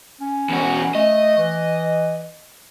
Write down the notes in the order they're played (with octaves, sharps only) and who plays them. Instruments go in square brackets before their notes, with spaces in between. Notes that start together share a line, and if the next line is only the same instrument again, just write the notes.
[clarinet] C#4
[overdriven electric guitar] E2 F#4
[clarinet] A3 [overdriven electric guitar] D#5
[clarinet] E3